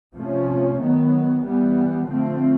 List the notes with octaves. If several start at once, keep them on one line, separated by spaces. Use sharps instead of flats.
C3 F3 A3 C#4
D#3 F#3 B3
E3 G3 B3
D3 F3 A3 C4